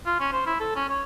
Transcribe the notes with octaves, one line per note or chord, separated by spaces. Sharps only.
F4
C#4
C5
E4
A4
C#4
C#5